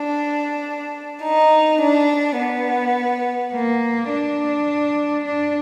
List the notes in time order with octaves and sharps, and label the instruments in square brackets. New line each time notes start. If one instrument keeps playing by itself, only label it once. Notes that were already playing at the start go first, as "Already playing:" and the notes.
Already playing: [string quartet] D4
D#4
D4
B3
A#3
D4
D4